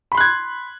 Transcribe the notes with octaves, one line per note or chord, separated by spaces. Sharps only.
B5 C6 F#6 G#6